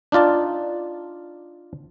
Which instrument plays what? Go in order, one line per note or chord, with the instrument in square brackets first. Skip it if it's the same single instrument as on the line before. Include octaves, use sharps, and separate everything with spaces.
[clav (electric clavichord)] D4 D#4 F4 D5 A5